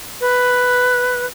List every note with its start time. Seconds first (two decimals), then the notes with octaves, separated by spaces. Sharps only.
0.21 B4